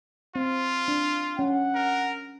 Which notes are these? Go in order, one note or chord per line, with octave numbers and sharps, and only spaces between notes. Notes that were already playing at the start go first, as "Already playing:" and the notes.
C4 F4
D4
C#4 F#5
A#4